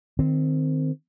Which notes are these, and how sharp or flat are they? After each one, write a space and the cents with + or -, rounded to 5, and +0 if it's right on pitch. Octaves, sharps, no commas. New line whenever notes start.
D#3 -20 C4 -10